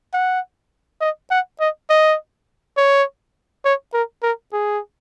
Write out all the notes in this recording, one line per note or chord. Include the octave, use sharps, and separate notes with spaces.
F#5
D#5
F#5
D#5
D#5
C#5
C#5
A#4
A#4
G#4